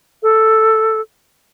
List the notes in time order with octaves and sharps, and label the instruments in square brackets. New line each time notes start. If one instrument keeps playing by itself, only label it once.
[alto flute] A4